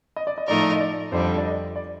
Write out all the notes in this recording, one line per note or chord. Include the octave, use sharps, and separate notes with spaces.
D#5
D5
D#5
A2 F3 A3 D#4 A#4 D5
D#5
D5
F2 D3 G3 C5
D5
D#5
D5